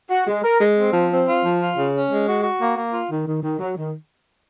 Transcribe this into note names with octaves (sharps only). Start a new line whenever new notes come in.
F#4
G#3
A#4
G#3
C4
F3
C4
F4
F3
F4
C#3
C#4
G#3
F#4
F#4
A#3
A#3
F4
D#3
D#3
D#3
F#3
D#3